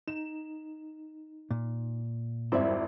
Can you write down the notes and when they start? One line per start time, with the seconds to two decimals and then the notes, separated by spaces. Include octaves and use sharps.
0.08 D#4 E7
1.51 A#2
2.52 G#1 F2 G3 E4 C5 D5 E5